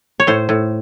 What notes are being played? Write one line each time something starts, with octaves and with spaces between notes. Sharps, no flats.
C#5
A2 C5
A2